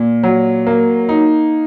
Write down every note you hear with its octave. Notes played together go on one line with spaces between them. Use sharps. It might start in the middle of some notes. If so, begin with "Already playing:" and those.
Already playing: A#2
F#3
A#3
D#4